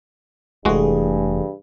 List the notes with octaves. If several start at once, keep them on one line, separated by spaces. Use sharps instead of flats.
F1 G2 E3 G#3 A3 F#4 G#4